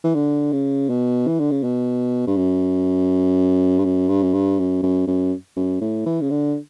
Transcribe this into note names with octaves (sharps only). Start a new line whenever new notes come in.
E3
D3
C#3
B2
E3
D3
C#3
B2
G2
F#2
G2
F#2
G2
F#2
G2
F#2
F#2
F#2
F#2
A2
E3
C#3
D3